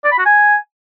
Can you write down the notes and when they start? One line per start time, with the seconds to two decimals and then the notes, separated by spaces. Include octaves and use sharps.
0.04 D5
0.12 B5
0.19 F#4
0.26 G#5